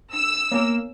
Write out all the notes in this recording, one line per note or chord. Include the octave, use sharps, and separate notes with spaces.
D4 E6
A#3 B3 C#5